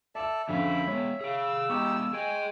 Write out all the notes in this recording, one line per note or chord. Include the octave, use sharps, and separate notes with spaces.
A4 D5 E5 A5 E6
F2 D3 C#4 F#4 E5 F5 B5
G#3 B3 C#5
G#4 F5 E6
G#3 B3 D#4 G4 C#6
G#4 D#5 G5 G#5